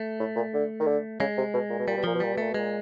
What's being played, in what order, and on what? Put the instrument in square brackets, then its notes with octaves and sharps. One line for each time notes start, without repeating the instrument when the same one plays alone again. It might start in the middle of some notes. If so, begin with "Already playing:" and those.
Already playing: [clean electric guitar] A3
[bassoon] A2
A#2
D3
D#3
D3
[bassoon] C#3 [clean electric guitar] G#3
[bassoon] C3
B2
A#2
B2
[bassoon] A#2 [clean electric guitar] G3
[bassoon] B2
[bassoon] A#2 [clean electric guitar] F3
[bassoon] B2
[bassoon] A#2 [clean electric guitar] G3
[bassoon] B2
[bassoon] A#2 [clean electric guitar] A3
[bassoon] B2
[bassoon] A#2 [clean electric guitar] G#3